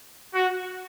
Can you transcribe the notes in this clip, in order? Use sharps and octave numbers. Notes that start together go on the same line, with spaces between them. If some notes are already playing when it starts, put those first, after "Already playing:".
F#4